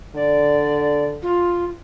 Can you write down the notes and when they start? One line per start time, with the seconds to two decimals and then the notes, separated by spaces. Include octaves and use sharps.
0.16 D3 D5
1.23 F4